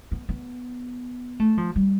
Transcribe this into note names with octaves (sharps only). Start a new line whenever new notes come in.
B3
B3
A3
F3
G3